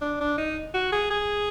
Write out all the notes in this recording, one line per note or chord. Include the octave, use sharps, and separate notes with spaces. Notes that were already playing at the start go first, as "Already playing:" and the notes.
D4
D4
D#4
F#4
G#4
G#4